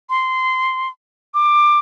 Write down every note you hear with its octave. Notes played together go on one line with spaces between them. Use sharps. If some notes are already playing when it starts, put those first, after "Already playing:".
C6
D6